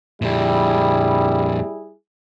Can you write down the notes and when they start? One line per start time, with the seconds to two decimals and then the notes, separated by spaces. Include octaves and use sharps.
0.22 F2 A#2 G3 E4 G#4